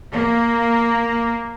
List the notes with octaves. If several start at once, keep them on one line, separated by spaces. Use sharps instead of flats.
A#3